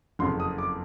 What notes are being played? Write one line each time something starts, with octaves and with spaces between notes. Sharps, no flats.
F#1 F2 C#3 C6
D#6
D6